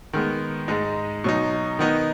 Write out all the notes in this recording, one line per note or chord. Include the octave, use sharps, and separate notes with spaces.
D#3 G#3 B3
G#2 G#3 D#4
B2 F#3 D#4
D#3 B3 D#4